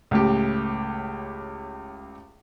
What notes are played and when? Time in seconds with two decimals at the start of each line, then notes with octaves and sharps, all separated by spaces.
0.11 C#2 A2 G4